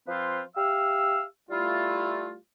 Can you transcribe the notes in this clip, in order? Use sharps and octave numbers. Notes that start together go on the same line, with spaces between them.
F3 C4 F4 B4 C5
G4 E5 F5 E6
G3 A3 E4 F4